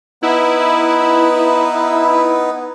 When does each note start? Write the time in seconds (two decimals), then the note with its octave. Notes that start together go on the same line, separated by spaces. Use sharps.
0.23 B3 D#4 E4 B4